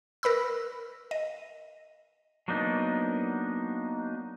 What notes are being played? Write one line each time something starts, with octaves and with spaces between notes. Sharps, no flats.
A#4 B4 B5 E6
D#5
F#3 A#3 B3 D4 D#4